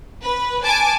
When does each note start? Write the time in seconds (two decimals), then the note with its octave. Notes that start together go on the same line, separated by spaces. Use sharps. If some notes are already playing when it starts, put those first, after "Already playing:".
0.21 B4
0.63 G#5 A5 D6